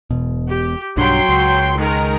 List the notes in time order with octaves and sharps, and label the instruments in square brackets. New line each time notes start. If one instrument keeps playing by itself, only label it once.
[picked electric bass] E1 B2
[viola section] G4
[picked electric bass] B1 G2 D4 [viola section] F#3 G5 C6
[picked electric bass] C#2
[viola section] D#3 G#3 A#4